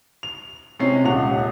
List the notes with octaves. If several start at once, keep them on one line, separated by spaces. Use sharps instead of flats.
F7
C3 G#3 C#4 C7
D#1 C#2 F#5 F7